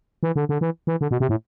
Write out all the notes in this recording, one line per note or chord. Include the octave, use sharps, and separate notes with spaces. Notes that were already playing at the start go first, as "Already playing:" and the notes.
E3
D3
D3
E3
E3
D3
B2
C3
A2